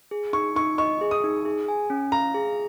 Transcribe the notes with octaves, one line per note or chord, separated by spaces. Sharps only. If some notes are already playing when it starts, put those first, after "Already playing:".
G#4
D#4 C#6
D#4 C#6
D#5 C#6
G#4
D#6
D#4
G#4
G#5
C#4
F5 A#5
G#4